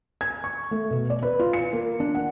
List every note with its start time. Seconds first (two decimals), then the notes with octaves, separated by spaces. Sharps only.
0.21 G#6
0.44 C#6
0.71 A3
0.90 B2
1.10 D5
1.23 B4
1.40 F4
1.53 C#7
1.73 A#3
2.00 D4
2.15 F#5